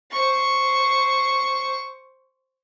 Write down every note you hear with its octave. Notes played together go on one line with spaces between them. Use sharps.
C5 C#6